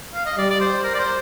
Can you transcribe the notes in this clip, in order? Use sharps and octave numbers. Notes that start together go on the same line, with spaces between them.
F5
D#5
G3 D5
D5
C5
A#4
D5
C5